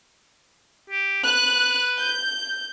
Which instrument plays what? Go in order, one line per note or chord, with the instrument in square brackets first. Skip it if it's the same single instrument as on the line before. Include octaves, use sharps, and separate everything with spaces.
[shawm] G4
[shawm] B4 [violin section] F#6
[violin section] G6